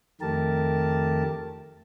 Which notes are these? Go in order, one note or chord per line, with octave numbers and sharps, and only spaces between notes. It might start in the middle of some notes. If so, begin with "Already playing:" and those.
F2 D#3 A3 G4 A#4 A5